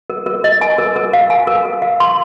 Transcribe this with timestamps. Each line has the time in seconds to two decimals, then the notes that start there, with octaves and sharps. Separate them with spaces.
0.10 A#4
0.26 A#4
0.44 D#5
0.61 G#5
0.78 A#4
0.96 A#4
1.13 F5
1.30 G#5
1.47 A#4
1.65 A#4
1.82 F5
2.00 C6